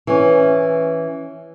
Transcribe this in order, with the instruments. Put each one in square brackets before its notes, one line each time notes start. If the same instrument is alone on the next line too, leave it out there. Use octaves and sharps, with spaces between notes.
[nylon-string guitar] E3 C#4